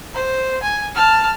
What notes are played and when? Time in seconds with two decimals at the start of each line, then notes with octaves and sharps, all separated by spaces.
0.13 C5
0.62 G#5
0.95 A5 F6